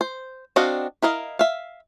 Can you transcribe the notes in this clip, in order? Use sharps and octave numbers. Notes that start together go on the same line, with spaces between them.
C5
C4 D4 F#4 D#5 F5
E4 A#4 D#5 F5
E5 F5